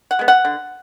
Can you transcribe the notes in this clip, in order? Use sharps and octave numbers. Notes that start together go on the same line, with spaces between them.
F#5
G#3 B3
F#5
D3